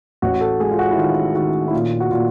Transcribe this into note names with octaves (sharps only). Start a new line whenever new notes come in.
A1 F#4
A4
G#3 G#4
F4
F#4
E4
D#3 F4
D#3 F#4
E4
A#2 F4
F#4
A#2 F4